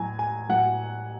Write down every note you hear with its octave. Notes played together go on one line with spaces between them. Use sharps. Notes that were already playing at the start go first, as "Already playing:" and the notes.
Already playing: A2 F#3 G#5
G#5
A2 F#3 F#5